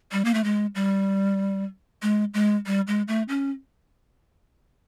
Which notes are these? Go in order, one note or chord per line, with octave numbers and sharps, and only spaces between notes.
G3
A#3
A3
G#3
G3
G#3
G#3
G3
G#3
A3
C#4